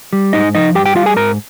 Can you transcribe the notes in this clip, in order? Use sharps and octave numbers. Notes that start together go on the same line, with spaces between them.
G3
G#2 D#4 D#5
F3 D#4 D#5
G2 G4 G5
G4 G5
G3 F4 F5
G#4 G#5
G#2 A#4 A#5